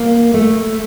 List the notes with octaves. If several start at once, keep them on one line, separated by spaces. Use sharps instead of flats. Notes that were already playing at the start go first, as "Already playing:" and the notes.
Already playing: A#3
A3